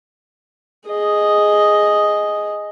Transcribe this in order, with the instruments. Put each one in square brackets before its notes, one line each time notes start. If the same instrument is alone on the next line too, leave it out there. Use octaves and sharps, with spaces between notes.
[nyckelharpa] G#4 D#5